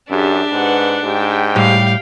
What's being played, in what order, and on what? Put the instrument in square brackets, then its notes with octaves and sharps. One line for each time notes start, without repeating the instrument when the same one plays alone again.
[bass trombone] F#2 [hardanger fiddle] D4 [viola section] G4 G#4 E5
[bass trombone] G#2 [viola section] B4 F#5
[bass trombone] G#2 [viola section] G4 G5
[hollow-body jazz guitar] A2 G3 [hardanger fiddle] F5